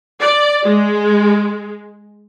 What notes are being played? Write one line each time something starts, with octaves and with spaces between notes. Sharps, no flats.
D5
G#3